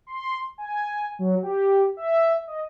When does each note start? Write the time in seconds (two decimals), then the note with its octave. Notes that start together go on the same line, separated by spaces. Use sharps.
0.07 C6
0.58 G#5
1.19 F#3
1.43 G4
1.97 E5
2.47 D#5